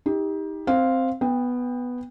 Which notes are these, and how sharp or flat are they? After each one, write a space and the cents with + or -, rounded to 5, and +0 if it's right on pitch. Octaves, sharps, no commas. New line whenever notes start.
D#4 +30 G4 +20
C4 +0 F5 +0
B3 +0 G5 +25